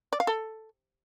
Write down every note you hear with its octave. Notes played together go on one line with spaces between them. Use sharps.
D5
F5
A4